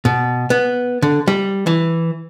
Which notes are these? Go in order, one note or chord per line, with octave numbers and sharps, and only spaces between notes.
B2
B3
D3
G3
E3